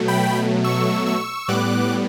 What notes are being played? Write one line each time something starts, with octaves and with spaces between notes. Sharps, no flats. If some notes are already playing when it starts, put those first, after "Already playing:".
Already playing: B2 F#3 A3
G5 B5
C#6 E6
C#6 E6
A2 G3 B3 D6 F#6